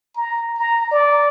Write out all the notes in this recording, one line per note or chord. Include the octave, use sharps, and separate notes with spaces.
A#5
A#5
D5